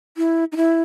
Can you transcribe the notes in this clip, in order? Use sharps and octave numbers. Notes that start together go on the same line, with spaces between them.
E4
D#4
E4